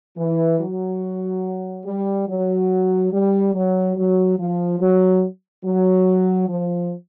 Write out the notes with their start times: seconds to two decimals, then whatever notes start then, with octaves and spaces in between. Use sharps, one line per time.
0.18 E3
0.60 F#3
1.85 G3
2.28 F#3
3.12 G3
3.54 F#3
3.97 F#3
4.38 F3
4.80 F#3
5.64 F#3
6.49 F3